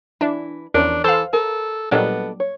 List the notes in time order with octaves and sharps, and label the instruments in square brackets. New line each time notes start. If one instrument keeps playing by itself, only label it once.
[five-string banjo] E3 E4 [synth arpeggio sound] D4
[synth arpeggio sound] E2 [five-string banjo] F3 C#4 A#4 [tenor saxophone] D4
[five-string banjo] E3 [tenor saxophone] A4 [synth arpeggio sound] C5 F5
[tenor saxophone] A4 [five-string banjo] A#4
[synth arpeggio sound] A#2 F#3 G3 [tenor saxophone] B3 [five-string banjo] D4 A4 D#5
[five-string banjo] C#5